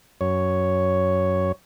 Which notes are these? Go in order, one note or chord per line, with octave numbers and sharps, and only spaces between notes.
F#2 C#5